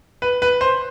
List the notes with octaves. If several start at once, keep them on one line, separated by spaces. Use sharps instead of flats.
B4
B4
C5